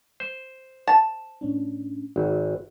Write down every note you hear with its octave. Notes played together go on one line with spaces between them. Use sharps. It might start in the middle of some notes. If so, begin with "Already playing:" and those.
C5
A5
A2 C#4 D4
G#1 F#4